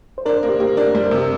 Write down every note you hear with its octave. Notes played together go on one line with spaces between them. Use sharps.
C5
D4 A#4
C5
A#3
G4
A#3 G4
D4 A#4
G3 C5
A#4
C3
G4